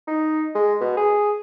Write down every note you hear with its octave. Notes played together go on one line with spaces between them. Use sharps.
D#4
G#3
B2
G#4